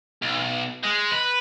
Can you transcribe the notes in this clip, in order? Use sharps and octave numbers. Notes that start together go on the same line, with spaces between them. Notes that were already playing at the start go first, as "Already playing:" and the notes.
B1
G#3
B4